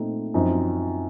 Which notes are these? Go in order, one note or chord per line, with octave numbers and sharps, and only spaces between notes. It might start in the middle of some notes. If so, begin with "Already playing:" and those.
Already playing: A#2 A3 C4 D#4
F#2 F3 C4 D#4